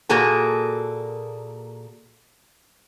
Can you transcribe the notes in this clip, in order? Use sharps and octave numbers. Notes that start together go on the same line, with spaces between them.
A#2 A#3 F#4 G#4 A4